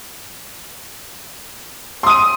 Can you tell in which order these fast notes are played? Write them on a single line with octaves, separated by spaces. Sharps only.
C6 D#6 D#7